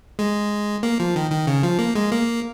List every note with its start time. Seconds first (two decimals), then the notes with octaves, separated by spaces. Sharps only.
0.19 G#3
0.83 A#3
1.00 F3
1.16 D#3
1.31 D#3
1.47 C#3
1.63 F3
1.79 A#3
1.95 G#3
2.12 A#3